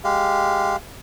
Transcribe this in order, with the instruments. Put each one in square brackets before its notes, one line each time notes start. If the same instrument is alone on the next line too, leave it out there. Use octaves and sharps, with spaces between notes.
[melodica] G#3 G4 F5